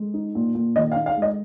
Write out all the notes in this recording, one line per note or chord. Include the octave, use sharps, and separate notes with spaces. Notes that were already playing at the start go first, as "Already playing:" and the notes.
Already playing: G#3
D#4
A#2
A#2
D#3 D#5
F5
D#4
F5
G#3
D#5